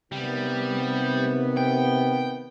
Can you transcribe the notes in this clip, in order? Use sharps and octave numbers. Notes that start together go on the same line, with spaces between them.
C3 D#3 G3 B3
G5